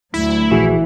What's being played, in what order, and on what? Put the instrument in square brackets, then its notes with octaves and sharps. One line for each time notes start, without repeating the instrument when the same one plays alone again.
[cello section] D2 F#3 [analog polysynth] E4 [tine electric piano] B6
[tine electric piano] A#1 F#4 G#4 [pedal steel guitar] E3